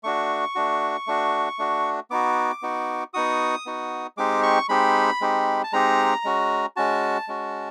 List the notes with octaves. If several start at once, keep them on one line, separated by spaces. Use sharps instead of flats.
A3 D4 F#4 C#6
A3 D4 F#4
A3 D4 F#4
A3 D4 F#4
B3 D#4 F#4 D6
B3 D#4 F#4
B3 D#4 F#4 D#6
B3 D#4 F#4
G#3 C4 D#4 G4 D6
C#6
G#3 C4 D#4 G4 B5
G#3 C4 D#4 G4
A5
G#3 C4 D#4 G4 A#5
G#3 C#4 F#4
G#3 C#4 F#4 A5
G#3 C#4 F#4